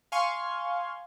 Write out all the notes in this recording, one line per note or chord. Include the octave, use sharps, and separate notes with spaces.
F5 G#5 C6 C#6